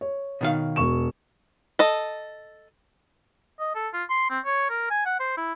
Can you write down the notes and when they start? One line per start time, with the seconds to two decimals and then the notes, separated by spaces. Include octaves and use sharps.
0.01 C#5
0.41 B2 D#3 F5
0.76 E1 C#6 E7
1.79 A4 D#5
3.60 D#5
3.75 A4
3.94 F4
4.10 C6
4.30 C4
4.45 C#5
4.70 A#4
4.90 G#5
5.06 F#5
5.20 C5
5.37 E4